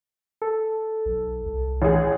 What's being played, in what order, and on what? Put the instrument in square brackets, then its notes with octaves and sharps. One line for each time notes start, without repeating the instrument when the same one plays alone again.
[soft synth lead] A4
[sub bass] B1
C2
[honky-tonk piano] A1 G#4